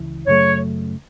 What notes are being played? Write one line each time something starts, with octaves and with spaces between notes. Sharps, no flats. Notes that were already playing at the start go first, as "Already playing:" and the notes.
Already playing: C#2 E3
F#2 C#3 F#3 A3 C#5